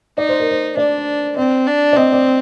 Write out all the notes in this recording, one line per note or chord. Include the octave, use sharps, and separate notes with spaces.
D#4 D5
C5
A#4
C5
D4 D5
C4 D5
D4
D5
C4 D#5
D5